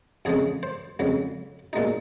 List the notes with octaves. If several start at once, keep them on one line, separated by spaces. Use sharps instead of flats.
F2 C#3 G#3 G#4
C5
F2 C#3 G#3
A#2 G#3 D#4